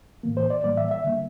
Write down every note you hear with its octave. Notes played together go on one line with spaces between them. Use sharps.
A2 E3 A#3
C5
D5
A2 E3 G3 A#3 D5
E5
E5
D3 G3 A#3